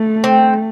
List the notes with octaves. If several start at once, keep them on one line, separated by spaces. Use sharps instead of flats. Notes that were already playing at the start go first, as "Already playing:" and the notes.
Already playing: A3
C4